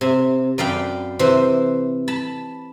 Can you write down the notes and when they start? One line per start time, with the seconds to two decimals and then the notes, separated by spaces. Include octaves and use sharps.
0.01 C3
0.58 F#2 D5 F5 G5 B5
1.19 C3 E3 C5
2.08 A5 B5